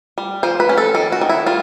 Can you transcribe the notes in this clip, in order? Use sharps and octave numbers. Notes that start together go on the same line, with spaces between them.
G3
F3 C5
B4
C#4
A4
D#3 A4
F#4
D#3
E4
G3 F4